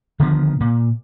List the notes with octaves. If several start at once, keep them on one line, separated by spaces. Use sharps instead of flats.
D3 D#3 F3 B3
A#2